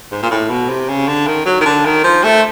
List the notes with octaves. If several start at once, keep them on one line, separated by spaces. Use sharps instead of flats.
G#2
A#2
A2
B2
C3
C#3
D3
D#3
F#3
D#3
D3
D#3
F3
A3